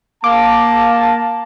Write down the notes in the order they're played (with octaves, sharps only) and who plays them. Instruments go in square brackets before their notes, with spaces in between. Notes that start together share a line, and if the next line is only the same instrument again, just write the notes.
[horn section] A#3 A5 [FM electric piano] D6